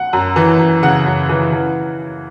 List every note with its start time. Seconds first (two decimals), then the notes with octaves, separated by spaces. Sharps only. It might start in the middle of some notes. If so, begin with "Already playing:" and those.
Already playing: F#5
0.13 F#2
0.36 E3
0.59 F#2
0.83 C#3 F#5
1.06 F#2
1.29 E3
1.53 E3